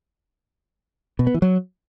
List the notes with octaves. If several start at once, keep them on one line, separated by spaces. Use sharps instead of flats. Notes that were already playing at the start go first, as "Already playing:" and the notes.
B2
B3
E3
F#3